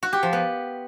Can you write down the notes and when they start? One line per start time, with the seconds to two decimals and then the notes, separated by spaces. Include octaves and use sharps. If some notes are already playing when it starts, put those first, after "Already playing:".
0.03 F#4
0.13 G4
0.23 F3
0.33 B3